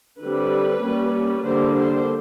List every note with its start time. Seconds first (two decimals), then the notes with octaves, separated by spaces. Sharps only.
0.21 D3 G3 C4 B4
0.83 G3 A#3 C#4
1.43 D3 G3 A#3 D4 C5
1.74 C5